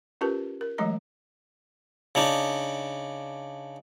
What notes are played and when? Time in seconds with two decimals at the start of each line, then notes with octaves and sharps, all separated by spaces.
0.21 C#4 F4 G4 A#4 B4 A5
0.61 A#4
0.78 E3 F#3 G#3 A3 D#5 A#5
2.15 C#3 D4 D#4